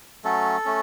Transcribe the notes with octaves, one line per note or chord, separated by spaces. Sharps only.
F#3 A3 C#4 A4
A3 C#4